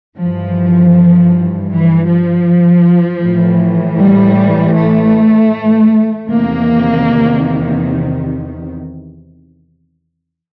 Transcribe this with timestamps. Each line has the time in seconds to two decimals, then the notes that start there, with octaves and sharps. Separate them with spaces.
0.17 G2 E3 F3
1.70 E3
2.07 F3
3.23 A2 E3
3.99 G3
4.76 A3
6.28 E2 C3 D#3 A#3